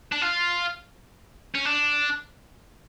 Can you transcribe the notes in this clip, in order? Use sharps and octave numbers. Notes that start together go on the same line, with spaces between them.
D4
F4
C#4
D4